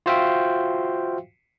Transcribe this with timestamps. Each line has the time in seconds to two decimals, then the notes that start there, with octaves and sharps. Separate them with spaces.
0.06 F4 F#4 C5 E5 F5 G5